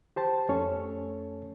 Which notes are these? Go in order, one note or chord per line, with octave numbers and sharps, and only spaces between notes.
G4 C5 A5
F2 A3 C#4 A4 C#5